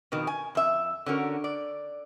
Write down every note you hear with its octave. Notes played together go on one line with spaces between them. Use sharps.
F2 B2 D#3
G#5
F2 E5
D3 C#4 F#4 A#4
D5